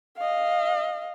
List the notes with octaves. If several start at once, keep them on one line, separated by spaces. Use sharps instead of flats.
D#5 F5